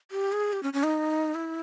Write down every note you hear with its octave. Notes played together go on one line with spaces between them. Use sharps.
G4
G#4
G4
C#4
C#4
D#4
E4